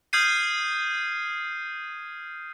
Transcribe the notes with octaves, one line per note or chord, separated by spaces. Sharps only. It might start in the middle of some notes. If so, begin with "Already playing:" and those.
D#6 F6 G6 G#6 C7 D#7